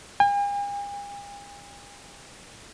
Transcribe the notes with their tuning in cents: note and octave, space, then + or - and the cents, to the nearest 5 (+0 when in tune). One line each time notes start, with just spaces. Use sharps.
G#5 -45